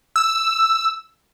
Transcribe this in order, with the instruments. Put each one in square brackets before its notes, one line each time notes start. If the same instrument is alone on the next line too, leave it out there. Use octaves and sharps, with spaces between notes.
[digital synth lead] E6